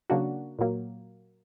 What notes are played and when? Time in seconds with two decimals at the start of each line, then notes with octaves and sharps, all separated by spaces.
0.10 C#3 F#3 A#3 D4 F#4
0.59 A#2 F#3 A#3